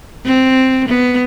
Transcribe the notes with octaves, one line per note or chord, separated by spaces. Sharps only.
C4
B3